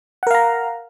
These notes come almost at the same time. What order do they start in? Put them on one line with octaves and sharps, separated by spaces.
F#5 A#4 F5 A#5